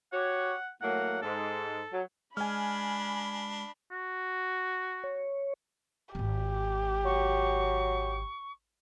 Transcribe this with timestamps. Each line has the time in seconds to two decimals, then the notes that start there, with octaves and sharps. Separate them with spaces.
0.12 F#4 G4 C#5 F#5
0.81 A2 F#3 A#3 F#5
1.22 G#2 A4
1.92 F#3
2.37 G#3 D4 G#5 B5 F6
3.91 F#4
5.04 C#5
6.15 D1 G#1 G4
7.05 F#3 C#6